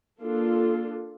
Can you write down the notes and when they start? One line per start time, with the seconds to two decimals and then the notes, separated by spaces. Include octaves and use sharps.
0.20 A#3 D4 F4 A4